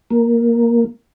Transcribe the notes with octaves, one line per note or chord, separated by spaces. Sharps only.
A#3